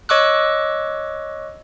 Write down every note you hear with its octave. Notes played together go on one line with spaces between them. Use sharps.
C#5 D#5 C#6 D6 E6 F#6